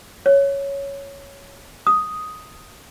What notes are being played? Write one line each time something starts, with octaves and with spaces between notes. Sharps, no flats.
C#5
D#6